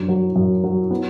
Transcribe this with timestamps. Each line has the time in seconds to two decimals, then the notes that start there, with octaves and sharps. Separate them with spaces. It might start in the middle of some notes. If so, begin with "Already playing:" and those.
Already playing: F#2 D4
0.09 F#3
0.36 F#2
0.64 F#3
0.91 B3